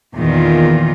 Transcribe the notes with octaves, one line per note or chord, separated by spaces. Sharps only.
E2 A#2 D#3 F4